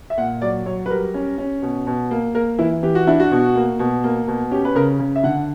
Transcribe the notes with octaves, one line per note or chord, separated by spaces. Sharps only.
E5
A#2 F#5
F#3 D5
F#3 C#5
B4
G3 A#4
C#4
C#4
B2
B2
A#3
A#3 A#4
E3 E4
E3 G4
F#4
D4 E4
F#4
B2
A#3
B2
A#3
B2
C#4 G4
B4
C#3 A#4
C#3
E5
D3 F#5